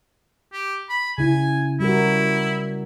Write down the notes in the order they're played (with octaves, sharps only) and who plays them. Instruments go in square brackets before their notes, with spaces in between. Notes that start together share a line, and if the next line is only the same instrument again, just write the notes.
[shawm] G4
B5
[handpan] C#3 E4 [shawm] G#5
[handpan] G3 F#4 A#4 [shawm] E4